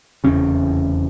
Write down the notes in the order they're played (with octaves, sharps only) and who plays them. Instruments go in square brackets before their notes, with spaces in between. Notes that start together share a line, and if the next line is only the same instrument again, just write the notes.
[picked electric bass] F1 E2 C#3 C#4